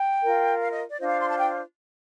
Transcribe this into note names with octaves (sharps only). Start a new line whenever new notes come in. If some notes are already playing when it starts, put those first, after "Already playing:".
Already playing: G5
F4 A#4
F5
D#5
D5
D4 F4 C5 D#5
F5
C6
A5
G5